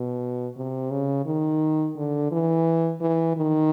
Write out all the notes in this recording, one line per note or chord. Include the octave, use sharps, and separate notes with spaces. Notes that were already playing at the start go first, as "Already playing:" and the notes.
Already playing: B2
C3
C#3
D#3
D3
E3
E3
D#3